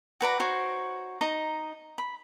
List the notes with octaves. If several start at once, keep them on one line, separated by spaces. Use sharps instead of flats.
F#4 B4 D5 A#5
D#4 F#4 C5 C#5
D#4 D#5 A#5
B5